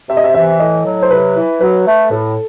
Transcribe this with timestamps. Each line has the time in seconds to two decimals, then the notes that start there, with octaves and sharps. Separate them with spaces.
0.09 C3 E5
0.17 D#5
0.24 E5
0.34 E3 E5
0.59 A2 D#5
0.85 F#3
1.03 C5
1.10 C3 B4
1.35 E3
1.61 F#3 B4
1.86 A3
2.11 A2 A4